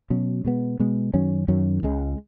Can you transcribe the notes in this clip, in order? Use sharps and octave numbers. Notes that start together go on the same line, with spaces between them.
B2 F#3 C#4
B2 G#3 B3
B2 G#3 B3
F#2 D#3 F#3 C#4
F#2 D#3 F#3 C#4
C#2 C#3 G#3